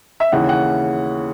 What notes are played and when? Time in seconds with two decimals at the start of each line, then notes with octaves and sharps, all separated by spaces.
0.20 E5
0.32 D#2 C#3 E3 F#5
0.49 F#5